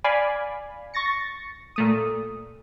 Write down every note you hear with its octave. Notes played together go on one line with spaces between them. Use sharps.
D5 F5 G#5 B5
C#6 A6 A#6 C#7
A#2 A3 D#6